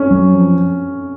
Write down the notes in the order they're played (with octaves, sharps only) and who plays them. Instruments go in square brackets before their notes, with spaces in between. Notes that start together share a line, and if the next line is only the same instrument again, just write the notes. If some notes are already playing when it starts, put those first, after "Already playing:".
Already playing: [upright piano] C#4
[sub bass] F#3
F3